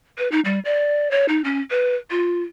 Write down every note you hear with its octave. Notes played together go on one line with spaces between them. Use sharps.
B4
D#4
G3
D5
C#5
D#4
C#4
B4
F4